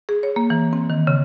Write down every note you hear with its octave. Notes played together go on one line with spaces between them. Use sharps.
G#4
C#5
A#3
E3
C4
D#3
C#3